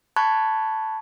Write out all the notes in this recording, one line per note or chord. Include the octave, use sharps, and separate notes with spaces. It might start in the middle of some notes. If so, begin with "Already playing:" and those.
A5 B5 C#6 F#6 G#6